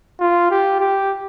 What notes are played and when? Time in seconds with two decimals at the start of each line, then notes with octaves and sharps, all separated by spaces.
0.20 F4
0.51 G4
0.80 G4